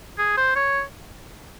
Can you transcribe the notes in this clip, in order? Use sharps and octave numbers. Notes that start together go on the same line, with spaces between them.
G#4
C5
C#5